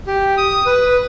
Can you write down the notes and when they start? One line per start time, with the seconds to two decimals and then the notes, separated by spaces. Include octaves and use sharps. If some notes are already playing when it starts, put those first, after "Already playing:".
0.07 G4
0.37 D#6
0.66 B4